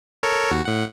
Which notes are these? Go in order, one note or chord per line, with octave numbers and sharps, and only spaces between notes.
A4 A#4 C#5
D#2 F#4
A2 F#5